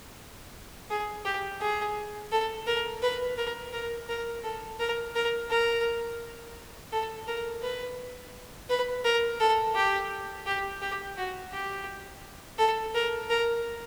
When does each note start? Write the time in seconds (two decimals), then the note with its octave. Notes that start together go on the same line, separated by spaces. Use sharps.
0.90 G#4
1.25 G4
1.61 G#4
2.32 A4
2.67 A#4
3.02 B4
3.38 A#4
3.73 A#4
4.09 A#4
4.44 A4
4.80 A#4
5.15 A#4
5.50 A#4
6.92 A4
7.28 A#4
7.62 B4
8.69 B4
9.04 A#4
9.40 A4
9.75 G4
10.46 G4
10.82 G4
11.17 F#4
11.52 G4
12.59 A4
12.95 A#4
13.30 A#4